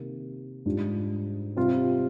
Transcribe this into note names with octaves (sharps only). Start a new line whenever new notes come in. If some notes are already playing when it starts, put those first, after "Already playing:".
Already playing: C3 D#3 A#3
G#2 G3 D4 F4
C3 G3 C4 F4